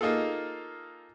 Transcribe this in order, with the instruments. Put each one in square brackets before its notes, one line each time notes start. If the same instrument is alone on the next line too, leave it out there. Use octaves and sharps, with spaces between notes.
[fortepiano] A#3 D#4 F4 G#4 A4